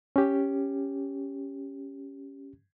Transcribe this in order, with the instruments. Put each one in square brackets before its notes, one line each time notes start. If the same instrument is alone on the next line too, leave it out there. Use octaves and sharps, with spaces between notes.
[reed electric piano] C#4 G4